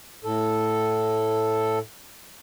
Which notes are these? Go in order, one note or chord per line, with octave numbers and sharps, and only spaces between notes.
A2 A4